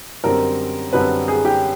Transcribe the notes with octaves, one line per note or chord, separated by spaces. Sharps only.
F#2 D3 G3 C4 A#4
F#2 D3 G3 C4 B4
G#4
G4